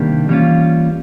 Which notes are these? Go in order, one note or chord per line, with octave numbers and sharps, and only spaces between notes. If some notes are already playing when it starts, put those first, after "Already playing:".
Already playing: C3 D#3 G3 A#3 D4
E3 G3 A#3 C#4 F4